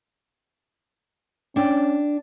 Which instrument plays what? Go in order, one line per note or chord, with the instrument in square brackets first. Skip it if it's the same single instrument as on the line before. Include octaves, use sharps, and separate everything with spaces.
[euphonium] C#4 [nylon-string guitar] D4 G5